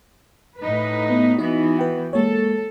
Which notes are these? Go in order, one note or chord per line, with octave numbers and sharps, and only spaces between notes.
A2 D#4 B4
B3 D#6
E3 B3 D#4 F#4 D#5
B4 G5
G#3 A#3 A4 C#5